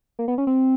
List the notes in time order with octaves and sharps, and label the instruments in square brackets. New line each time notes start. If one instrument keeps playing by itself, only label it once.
[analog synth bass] A#3
B3
C#4
C4